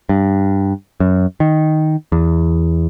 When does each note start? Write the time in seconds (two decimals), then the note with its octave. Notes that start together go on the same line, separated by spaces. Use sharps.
0.09 G2
1.00 F#2
1.40 D#3
2.12 E2